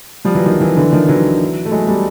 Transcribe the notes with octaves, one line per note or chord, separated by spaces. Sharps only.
F3 G3
E3 F#3
D#3 F3
E3 F#3
D3 E3
D#3 F3
E3 F#3
A3
F#3 G#3
G3 A3